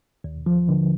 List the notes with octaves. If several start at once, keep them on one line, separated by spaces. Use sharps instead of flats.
D#2
F3
D3